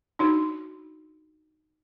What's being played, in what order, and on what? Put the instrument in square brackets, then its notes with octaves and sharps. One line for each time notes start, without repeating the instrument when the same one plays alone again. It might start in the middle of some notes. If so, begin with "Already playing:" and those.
[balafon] D4 D#4 F#4